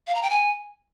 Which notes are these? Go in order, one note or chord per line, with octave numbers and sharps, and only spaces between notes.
F5
A#5
G5
G#5